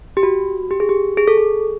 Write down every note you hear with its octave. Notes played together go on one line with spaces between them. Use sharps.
G4
F#4
G4
G#4
G4
G#4
A4
G#4